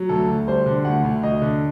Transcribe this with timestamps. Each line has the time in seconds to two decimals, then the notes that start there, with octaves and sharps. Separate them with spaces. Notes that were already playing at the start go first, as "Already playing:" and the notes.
Already playing: F#3
0.09 D2 A4
0.28 D2
0.47 G3 C5
0.66 D3
0.85 D2 F#5
1.04 D2
1.23 D2 D#5
1.42 D3